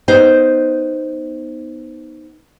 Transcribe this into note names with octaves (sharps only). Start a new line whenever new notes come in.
B3 D#4 C5